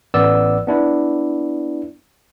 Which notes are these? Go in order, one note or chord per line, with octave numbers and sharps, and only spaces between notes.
A1 B3 D5 E6
B3 D4 E4